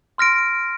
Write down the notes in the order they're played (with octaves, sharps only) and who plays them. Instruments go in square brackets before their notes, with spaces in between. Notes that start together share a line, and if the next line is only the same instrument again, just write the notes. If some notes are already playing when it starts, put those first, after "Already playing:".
[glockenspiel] C6 F6 A#6 D7